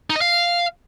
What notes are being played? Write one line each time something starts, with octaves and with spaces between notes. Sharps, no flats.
D#4
D#5
F5